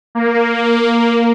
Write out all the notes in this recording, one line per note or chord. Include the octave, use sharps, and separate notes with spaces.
A#3